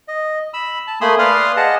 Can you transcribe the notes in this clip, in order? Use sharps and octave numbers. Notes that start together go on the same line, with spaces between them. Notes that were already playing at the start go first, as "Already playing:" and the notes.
D#5
B5 E6
A5
A3 A#3 G#5 B5 C6 D#6
B4 D5 F5 C6 D#6 F6
G#4 D#5 F#5 A5